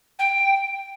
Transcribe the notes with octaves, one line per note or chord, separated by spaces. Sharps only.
G5